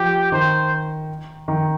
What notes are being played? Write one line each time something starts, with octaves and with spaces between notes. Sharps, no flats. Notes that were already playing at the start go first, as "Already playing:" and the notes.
Already playing: F3 G4
D#3 C5
D#3